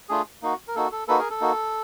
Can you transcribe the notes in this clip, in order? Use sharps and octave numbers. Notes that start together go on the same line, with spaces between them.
A3 D4 F4 G#4
A#3 D#4 F#4
A#4
A#3 D#4 F#4 A4
A4
A#3 D#4 F#4 A4 B4
G#4 A#4
A4
A#3 D#4 F#4